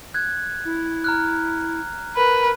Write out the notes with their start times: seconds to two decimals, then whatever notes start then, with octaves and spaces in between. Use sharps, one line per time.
0.14 F#6 G#6
0.65 E4
1.04 A#5 F6 F#6
2.16 A#4 B4